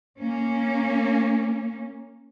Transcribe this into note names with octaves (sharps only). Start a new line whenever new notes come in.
A#3 C#4